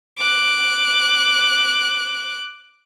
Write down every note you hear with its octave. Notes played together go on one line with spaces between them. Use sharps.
D6 F#6